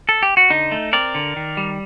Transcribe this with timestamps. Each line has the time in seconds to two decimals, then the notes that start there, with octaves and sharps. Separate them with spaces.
0.09 A4
0.23 G4
0.37 F#4
0.50 D3 D#4
0.72 A3
0.93 C4 A#4 D5
1.15 D3
1.36 D#3
1.57 G3